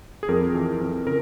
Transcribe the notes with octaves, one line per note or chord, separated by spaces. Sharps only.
G#4
F2 A#4
E3
F2
C#3 A#4